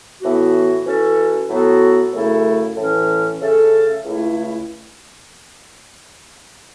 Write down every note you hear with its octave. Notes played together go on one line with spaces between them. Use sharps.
A2 E3 B3 F#4
E3 C#4 F#4 A4
A2 F#3 B3 F#4 A4
F#2 C#3 A3 E4 A4
A2 E3 C#4
C#3 A3 C#4 A4
C#2 C#3 A3 E4